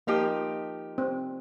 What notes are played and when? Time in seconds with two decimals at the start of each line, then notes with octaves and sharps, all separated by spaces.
0.07 F3 A#3 D#4 G4
0.98 C4